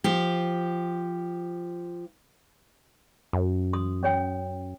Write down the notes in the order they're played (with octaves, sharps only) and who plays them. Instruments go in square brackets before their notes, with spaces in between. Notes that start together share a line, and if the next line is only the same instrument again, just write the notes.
[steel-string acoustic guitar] F3 G4
[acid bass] F#2
[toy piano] C6 D#6
C#4 C#5 G5